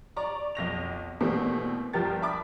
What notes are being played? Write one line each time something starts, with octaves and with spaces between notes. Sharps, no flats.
D5 A#5 C#6
B1 F2 A#6 F7
B2 E3 G3 A3 A#3 C4
G1 F3 G4 A#4 A6
E5 A5 B5 D6 D#6